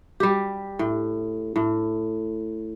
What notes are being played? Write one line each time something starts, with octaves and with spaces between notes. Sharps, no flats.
G3 G4
A2
A2